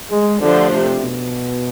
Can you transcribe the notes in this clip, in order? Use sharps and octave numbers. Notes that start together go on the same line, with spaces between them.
G#3
D3 F3 A3 D4 G4 C5
C3
B2